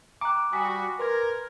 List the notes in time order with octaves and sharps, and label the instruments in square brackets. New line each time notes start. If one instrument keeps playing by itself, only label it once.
[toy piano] G5 A#5 [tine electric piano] D6 F#6
[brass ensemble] G3 F#4 [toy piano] G#5 [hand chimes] C#6 D#6 B6
[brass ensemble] A#4 [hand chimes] B4 C6 G#6